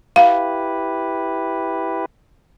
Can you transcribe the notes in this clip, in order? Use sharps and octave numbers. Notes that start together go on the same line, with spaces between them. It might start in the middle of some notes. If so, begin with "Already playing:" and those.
E4 G4 B4 F5